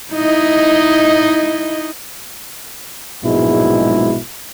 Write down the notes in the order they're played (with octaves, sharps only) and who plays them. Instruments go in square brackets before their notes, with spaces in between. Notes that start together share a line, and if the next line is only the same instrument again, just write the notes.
[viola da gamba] D#4 E4 D#5
[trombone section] A#1 G#2 B2 F#3 G#3 E4